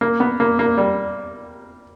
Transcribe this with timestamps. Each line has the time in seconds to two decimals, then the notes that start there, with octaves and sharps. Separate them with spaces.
0.01 A#3
0.20 B3
0.40 A#3
0.59 A#3
0.77 G3